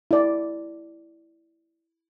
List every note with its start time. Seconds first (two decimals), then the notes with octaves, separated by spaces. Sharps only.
0.11 E4 D5